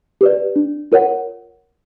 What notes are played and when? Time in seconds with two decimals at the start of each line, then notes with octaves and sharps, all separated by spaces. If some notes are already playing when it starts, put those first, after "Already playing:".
0.21 G4 B4 D5
0.56 D4
0.92 F4 A#4 C#5 F#5